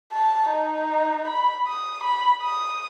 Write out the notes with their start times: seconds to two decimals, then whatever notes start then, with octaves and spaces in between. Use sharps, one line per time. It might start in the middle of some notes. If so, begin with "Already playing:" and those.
0.13 A5
0.50 D#4
1.28 B5
1.67 D#6
2.04 B5
2.42 D#6